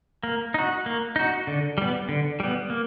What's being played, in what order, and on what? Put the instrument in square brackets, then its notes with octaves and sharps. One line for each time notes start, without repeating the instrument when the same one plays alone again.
[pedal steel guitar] A#3
D#4 F#4
A#3
D#4 F#4
D3
G3 B3
D3
G3 B3
A#3